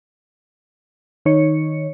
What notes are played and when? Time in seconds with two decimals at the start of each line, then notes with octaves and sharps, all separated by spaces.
1.26 D#3 D#4 C#5 C#7